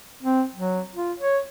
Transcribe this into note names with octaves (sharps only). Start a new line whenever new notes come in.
C4
F#3
F4
C#5